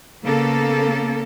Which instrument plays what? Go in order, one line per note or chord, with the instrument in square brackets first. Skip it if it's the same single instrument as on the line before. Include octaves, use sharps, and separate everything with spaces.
[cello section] C#3 A#3 B3 A4